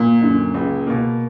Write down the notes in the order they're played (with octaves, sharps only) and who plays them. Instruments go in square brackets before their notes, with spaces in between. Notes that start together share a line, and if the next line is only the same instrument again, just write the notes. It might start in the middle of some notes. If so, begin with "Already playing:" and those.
Already playing: [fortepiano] A#2
[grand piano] F#2 D3
C#2
B2 A#3